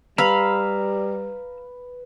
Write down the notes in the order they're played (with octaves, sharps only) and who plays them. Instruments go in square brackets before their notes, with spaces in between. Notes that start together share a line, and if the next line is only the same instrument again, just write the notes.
[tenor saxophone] G3 [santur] B4 [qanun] F5 B5 [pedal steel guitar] A#5 E6